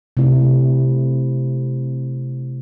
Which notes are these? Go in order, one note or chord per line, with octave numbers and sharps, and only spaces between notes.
C3 A3 E4